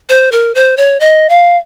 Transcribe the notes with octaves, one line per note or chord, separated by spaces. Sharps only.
C5
A#4
C5
C#5
D#5
F5